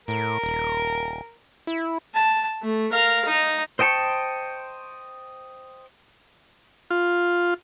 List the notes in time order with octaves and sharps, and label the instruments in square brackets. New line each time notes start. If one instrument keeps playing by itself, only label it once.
[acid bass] A2 [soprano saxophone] A#4
[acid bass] D#1
E4
[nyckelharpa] A5
A3
A#4 F5
D#4
[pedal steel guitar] C5 D#5 G5 A5 C#6
[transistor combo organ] F4